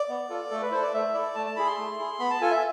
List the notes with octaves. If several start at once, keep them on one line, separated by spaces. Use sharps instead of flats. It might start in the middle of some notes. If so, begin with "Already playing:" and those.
Already playing: D5
B3
F4 A4
A3 A4
B4
E4 A4 C5
D5
A3 E5
E4 A4 D5
A3 A5
A5
E4 G#4 B5
C6
A3
E4 G#4
B3 B5
A5
F4 A4 G#5
E5